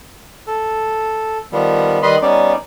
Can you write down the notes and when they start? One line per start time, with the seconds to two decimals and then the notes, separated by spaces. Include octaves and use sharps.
0.47 A4
1.52 D#3 F3 G3 B3
2.03 D#3 G3 B4 D#5 B5 C6
2.22 G3 B3 C#4 D#4 D5